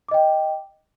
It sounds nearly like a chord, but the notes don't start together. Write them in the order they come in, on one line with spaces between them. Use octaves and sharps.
D6 D#5 G5